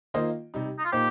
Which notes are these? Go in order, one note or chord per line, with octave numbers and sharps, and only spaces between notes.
D#3 A#3 F4 C5 D#5
C3 G3 D#4
D#4
F4
A#2 A#3 D#4 G4 C5